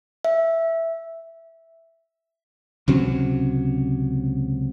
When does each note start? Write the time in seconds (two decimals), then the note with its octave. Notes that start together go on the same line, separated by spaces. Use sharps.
0.25 E5
2.88 C#2 C3 F#3 C#4